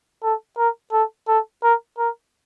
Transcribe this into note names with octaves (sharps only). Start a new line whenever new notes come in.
A4
A#4
A4
A4
A#4
A#4